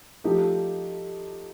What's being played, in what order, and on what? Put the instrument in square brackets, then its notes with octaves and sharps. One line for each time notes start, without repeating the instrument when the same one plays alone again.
[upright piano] F3 A3 D#4 G4